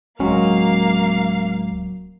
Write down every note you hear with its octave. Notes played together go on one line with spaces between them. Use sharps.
D1 F#3 G#3 A#3 C#4 F#4 F5